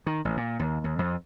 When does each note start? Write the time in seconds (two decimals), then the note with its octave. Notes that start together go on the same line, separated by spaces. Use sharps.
0.06 D#3
0.25 A1
0.37 A#2
0.59 D#2
0.84 D#2
0.99 F2